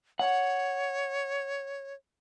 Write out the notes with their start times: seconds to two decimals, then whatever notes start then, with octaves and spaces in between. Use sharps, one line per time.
0.19 C#5 F#5